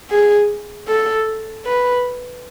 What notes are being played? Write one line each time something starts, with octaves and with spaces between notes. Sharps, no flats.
G#4
A4
B4